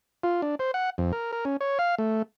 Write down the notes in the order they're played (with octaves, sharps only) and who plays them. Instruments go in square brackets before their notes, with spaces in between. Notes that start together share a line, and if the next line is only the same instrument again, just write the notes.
[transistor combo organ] F4
D4
C5
F#5
F2
A#4
A#4
C#4
C#5
F5
A3